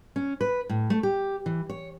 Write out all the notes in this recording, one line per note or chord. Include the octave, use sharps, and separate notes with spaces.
C#4
B4
A2
A3
G4
E3
C#5